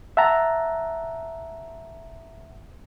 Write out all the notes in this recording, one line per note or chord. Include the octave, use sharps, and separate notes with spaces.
E5 F#5 A5 A#5